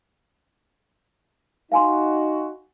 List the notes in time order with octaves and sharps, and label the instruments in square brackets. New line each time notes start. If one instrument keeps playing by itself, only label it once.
[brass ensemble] D#4 F#4 [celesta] F5 G#5 C6